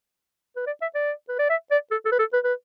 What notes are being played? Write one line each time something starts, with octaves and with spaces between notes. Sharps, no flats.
B4
D5
E5
D5
B4
D5
E5
D5
A4
A4
B4
A4
B4
B4